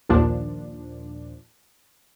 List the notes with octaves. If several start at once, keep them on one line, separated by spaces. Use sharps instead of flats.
A#1 D#2 A#2 F3 D4